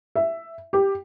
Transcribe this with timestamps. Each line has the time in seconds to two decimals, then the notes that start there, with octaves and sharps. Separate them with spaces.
0.15 E5
0.73 G4